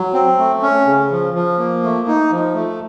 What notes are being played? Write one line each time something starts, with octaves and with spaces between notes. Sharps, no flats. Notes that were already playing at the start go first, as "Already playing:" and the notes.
Already playing: F#3
C4
A3
C#4
C#3
F3
F3
A#3
A3
D#4
F3
A3